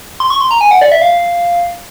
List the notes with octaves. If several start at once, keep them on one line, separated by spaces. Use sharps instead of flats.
C6
C#6
C6
A#5
G#5
F#5
D5
E5
F5